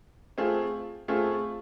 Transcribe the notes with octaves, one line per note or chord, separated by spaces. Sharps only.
A3 C4 F4 G#4
A3 C4 F4 G#4